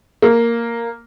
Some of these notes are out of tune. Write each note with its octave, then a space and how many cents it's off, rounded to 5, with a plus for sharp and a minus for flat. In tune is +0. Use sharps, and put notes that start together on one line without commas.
A#3 -5